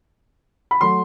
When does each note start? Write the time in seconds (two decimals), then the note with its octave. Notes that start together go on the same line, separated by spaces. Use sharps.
0.71 B5
0.81 F#3 A3 C6